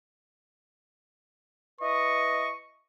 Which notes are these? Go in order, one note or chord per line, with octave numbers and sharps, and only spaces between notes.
E4 B4 D#5 C#6